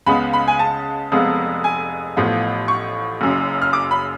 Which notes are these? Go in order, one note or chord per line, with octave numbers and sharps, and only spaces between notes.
C#2 C#3 G#3 B3 B5
B5
G#5
A5
F1 F2 F3 G#3 B3
G#5
A1 A2 F3 B3 F4
C#6
F#1 F#2 C#3
F6
D6
B5